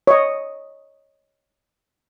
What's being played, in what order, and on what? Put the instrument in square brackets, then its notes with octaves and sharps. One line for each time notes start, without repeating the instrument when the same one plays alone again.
[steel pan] C#5 D#5